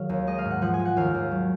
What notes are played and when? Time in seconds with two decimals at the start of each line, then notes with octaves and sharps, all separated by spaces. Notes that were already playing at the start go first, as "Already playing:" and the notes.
Already playing: D#3 F#3 G#4 F5
0.09 D#2
0.27 G#3 D#5
0.38 F5
0.45 G#2
0.51 F#5
0.62 F3 F#5
0.74 G#5
0.79 G#3
0.85 F#5
0.97 D#2 F5
1.14 D#2
1.31 F#3